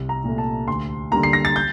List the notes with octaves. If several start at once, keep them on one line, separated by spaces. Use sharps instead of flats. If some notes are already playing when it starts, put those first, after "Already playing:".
Already playing: C2
A#5
A#2 A3
A5
D2 C6
D3 G3 A#3 A#5
C7
A#6
A6
G6